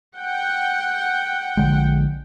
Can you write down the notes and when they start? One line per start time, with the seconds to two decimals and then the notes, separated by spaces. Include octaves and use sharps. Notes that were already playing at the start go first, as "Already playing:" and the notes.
0.18 F#5 G5
1.57 A#1 D3 G#3